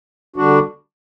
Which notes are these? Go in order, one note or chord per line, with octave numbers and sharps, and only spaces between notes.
D3 G3 D4 F#4